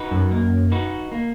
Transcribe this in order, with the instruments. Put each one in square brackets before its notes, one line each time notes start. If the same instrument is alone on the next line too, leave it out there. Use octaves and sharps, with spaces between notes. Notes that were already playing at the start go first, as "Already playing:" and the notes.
Already playing: [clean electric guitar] D#4 F#4 B4
[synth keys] F#2
[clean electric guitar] A#3
D#4 F#4 B4
A#3